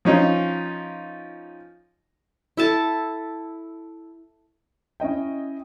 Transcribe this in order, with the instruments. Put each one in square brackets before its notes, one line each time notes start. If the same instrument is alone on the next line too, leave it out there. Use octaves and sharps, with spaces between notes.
[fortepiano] F3 C#4 D#4 F4
[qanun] E4 A4 A5
[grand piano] C#4 E4 D#5 G5